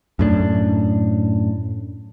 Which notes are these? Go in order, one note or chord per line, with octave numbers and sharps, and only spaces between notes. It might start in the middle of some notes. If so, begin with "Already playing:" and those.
F#2 A2 D4